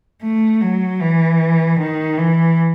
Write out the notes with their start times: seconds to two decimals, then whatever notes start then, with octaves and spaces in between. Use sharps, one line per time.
0.23 A3
0.61 F#3
1.01 E3
1.79 D#3
2.18 E3